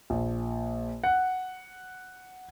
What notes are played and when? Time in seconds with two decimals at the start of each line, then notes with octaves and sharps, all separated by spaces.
0.10 A#1
1.04 F#5